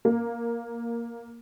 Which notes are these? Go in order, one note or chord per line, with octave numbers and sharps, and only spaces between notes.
A#3